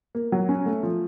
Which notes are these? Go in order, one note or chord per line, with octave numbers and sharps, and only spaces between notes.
A#3
F#3
C#4
A3
F3